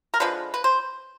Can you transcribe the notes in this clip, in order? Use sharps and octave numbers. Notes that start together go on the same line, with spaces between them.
A#4
D3 F3 G#3 B4
B4
C5